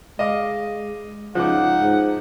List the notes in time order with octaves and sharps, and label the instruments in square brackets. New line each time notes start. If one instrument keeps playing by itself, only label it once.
[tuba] G#3 [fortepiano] D#5 F5 D6
[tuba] C#2 [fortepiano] F3 D6 [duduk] D#4 [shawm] F#5
[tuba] G#2